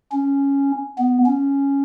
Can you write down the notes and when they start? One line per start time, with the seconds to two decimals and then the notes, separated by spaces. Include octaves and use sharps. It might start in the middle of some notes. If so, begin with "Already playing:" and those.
0.12 C#4
0.99 B3
1.26 C#4